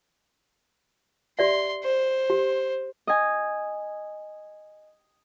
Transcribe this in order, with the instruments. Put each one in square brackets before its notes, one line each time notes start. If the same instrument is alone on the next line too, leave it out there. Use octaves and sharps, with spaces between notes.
[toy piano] G4 D5 E5 [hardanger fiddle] C6
[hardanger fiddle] C5
[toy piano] G4
[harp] D#5 G#5